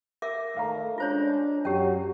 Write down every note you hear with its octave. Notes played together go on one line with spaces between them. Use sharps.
A#4 E5 D6
D#3 A3 F5 A#5
G#3 C#4 D4 F4 C5 C#5
F#2 F#3 C#4 G4